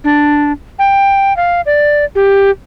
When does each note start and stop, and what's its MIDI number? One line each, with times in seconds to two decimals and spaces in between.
0.04 0.52 62
0.79 1.35 79
1.37 1.61 77
1.66 2.05 74
2.15 2.50 67